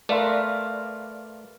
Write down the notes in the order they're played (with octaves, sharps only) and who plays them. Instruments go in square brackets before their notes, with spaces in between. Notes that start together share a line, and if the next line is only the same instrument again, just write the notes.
[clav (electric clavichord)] A3 [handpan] A#4 B4 [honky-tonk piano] D5 F5 C6